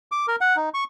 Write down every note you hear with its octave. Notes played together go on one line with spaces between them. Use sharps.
D6
A#4
F#5
D#4
C#6